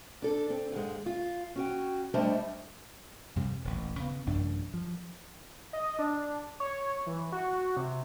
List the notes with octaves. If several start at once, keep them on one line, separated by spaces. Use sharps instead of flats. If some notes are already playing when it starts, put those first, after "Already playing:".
D4 A4
C4
D#2 G#2 G#3
F4
C#4 F#4 G5
G3 A3 D4 C5 D#5 A5
F2 C3 G3
D#1 A1
C#3 B3
A1 F#2 C3 D4
F3
D#5
D4
C#5
E3
F#4
C3